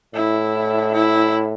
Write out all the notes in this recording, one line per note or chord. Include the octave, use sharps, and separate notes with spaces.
A2 E4
E4